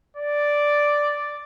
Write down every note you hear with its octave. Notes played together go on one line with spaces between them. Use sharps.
D5